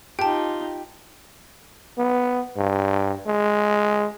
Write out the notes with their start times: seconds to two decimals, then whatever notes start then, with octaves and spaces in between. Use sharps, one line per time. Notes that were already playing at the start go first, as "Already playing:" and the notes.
0.19 D#4 F4 G4 G5 A5
1.98 B3
2.57 G2
3.27 G#3